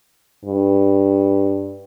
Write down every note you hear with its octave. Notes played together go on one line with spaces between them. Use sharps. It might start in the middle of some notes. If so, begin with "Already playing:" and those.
G2